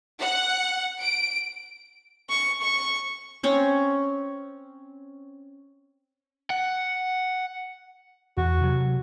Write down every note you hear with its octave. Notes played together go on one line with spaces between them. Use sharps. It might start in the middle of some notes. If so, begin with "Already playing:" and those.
F#5
D7
C#6
C#6
C4 C#4 C#5
F#5
E2 F#4
C3 F#3